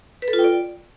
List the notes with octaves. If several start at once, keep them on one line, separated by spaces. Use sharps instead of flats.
B4
A4
F4
G5
D5